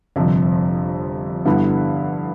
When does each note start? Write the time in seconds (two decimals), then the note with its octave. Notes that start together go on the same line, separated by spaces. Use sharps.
0.16 G1 F2 C3 F3
1.45 G2 D3 G3 B3 E4